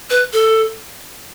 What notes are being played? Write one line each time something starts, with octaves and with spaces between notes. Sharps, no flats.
B4
A4